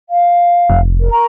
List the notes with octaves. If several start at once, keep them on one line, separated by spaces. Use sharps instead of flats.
F5
F1
A#4
A#4 A#5 C#6